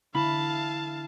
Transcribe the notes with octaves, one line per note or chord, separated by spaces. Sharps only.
D3 E4 F5 A5 B5